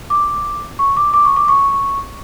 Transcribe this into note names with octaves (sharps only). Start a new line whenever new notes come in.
D6
C#6
D6
D6
C#6
D6
C#6